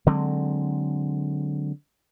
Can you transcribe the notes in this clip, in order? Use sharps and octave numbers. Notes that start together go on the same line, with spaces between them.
D3 F#3 G#3 C4